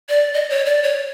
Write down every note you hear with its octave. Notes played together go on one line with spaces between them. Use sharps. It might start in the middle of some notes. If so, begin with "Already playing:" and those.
D5
D#5
C#5
D5
C#5